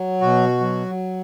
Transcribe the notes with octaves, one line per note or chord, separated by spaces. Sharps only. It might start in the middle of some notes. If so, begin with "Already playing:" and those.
Already playing: F#3
B2 F#4
F#3